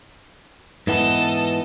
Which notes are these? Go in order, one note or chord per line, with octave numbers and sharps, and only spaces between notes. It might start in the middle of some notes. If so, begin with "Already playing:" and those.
G#2 E3 B3 A4 D#5